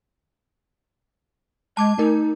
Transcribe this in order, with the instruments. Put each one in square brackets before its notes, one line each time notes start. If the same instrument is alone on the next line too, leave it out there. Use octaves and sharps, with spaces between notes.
[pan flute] G#3 [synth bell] A5 D6 G#6
[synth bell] A3 A#4 [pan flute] D#4